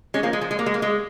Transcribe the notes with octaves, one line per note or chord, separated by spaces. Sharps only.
G#3 C#4
F3 A#3
G#3
F3
G#3
A#3
G#3
A#3
G#3